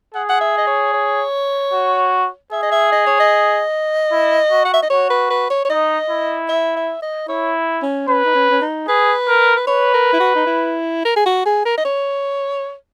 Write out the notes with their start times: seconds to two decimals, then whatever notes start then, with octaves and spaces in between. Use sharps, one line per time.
0.14 G#4 F#5
0.30 F#5
0.41 E5
0.58 D#5
0.67 C#5
0.94 C#5
1.73 F#4
2.52 G#4 E5
2.63 D#5
2.72 E5
2.92 D#5
3.07 C#5
3.20 D#5
4.12 E4
4.51 F#4
4.65 F#5
4.74 E5
4.83 D#5
4.90 F#4 C#5
5.10 B4
5.30 B4
5.50 C#5
5.65 C#5
5.70 D#4 D#5
6.10 E4
6.49 E5
6.77 E5
7.02 D#5
7.28 E4 C#5
7.83 C#4
8.08 C#4 B4
8.25 D#4
8.35 C#4
8.50 C#4
8.62 D#4
8.88 G#4 B4
9.28 A#4
9.56 B4
9.67 B4 C#5
9.94 A#4
10.13 E4
10.20 F#4
10.36 D#4
10.47 E4
11.05 A#4
11.16 G#4
11.26 F#4
11.46 G#4
11.66 A#4
11.78 D#5
11.85 C#5